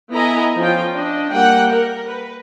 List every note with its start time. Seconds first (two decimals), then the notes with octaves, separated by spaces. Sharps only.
0.11 B3 E4 A4 D#5 G#5 A#5
0.58 F3 C#4 F4 G5
0.93 D4 D#5
1.31 G3 A#3 F#5 G5
1.71 A#4
2.07 B4